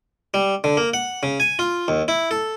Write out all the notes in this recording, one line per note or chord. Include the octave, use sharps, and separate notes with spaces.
G3
D3
A#3
F#5
C#3
G#5
F4
D#2
E4
A4